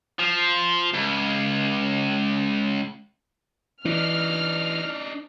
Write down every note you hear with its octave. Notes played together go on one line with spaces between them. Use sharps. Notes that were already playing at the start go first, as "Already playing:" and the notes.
F3
C#2
E3 D4 D#4 F6